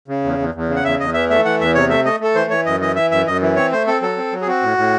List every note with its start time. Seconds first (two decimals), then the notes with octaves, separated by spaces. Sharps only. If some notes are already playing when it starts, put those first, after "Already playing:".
0.08 C#3
0.24 E2
0.39 E2
0.55 E2
0.69 C#3
0.76 F#5
0.84 E2 E5
1.00 E2 D#5
1.14 E3 E5
1.30 A3 E5
1.45 E3 F#5
1.60 E2 E5
1.75 C3 C#5
1.89 A3 E5
2.05 A3 D#5
2.20 A3 A4
2.35 E3 C5
2.50 E3 C#5
2.66 F#2 D#5
2.80 E3 D#5
2.96 E3 E5
3.11 F#2 E5
3.27 F#2 D#5
3.41 E3
3.56 C4 C#5
3.72 A3 C5
3.87 C4 A4
4.02 F#3 A4
4.17 C4
4.32 F#3
4.41 G#4
4.47 C4 F#4
4.62 A2
4.78 A2